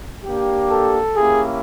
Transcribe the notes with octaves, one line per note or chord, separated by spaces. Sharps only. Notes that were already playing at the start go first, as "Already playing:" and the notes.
A#3 D4 G4
A4
A#3 C#4 E4 G4 G#4